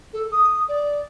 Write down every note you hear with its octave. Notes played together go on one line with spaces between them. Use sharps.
A4
D#6
D5